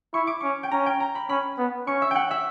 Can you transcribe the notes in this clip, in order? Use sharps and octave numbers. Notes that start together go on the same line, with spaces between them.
E4 C#6
D6
C#4 C#6
G5
C#4 A#5
G5
A#5
B5
C#4 B5
B3
C#4 C#6
E5
F#5 G5
E5